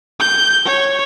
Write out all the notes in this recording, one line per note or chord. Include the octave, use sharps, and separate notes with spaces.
G6
C#5